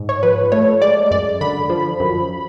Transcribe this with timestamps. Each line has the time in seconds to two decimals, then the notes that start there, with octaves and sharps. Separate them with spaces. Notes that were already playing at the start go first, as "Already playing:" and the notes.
Already playing: G#2
0.09 C#5
0.23 F3 B4
0.52 A3 C#5
0.82 G#3 D5
1.11 F#2 D5
1.41 D3 B5
1.70 F3
2.00 F#2